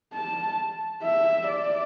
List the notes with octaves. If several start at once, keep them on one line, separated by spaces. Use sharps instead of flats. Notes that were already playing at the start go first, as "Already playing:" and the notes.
A5
E5
D5